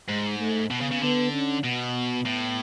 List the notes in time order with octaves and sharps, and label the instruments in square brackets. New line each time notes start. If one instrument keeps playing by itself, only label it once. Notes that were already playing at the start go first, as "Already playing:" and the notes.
[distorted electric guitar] G#2 [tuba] G#3
[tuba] A3
[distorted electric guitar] B2 [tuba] B3
[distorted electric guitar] C#3
C#3
[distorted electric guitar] D3 [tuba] B3
[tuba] C#4
[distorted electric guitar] B2 [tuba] B3
[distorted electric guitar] A2